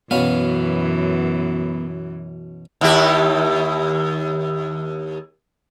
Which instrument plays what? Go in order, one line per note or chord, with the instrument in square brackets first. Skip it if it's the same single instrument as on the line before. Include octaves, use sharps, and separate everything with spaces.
[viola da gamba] F#2 E3 [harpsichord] B2 C#4 F5 [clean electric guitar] B3
[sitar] D#2 E4 G4